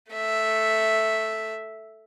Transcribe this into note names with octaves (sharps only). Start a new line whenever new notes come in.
A3 E5